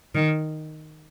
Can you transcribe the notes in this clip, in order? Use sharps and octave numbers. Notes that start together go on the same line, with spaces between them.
D#3